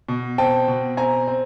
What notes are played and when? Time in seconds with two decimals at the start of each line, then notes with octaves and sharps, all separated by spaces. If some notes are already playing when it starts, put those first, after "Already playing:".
0.09 B2
0.38 C4 G5 A5
0.68 B2
0.97 C4 G#5 A#5
1.28 C4